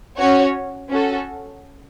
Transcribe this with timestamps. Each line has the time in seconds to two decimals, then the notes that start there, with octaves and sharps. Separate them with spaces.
0.17 C#4 F#4 C#5
0.88 C#4 F#4 A4